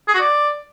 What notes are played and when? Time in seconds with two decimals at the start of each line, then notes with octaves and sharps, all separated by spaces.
0.08 G#4
0.14 F#4
0.20 D5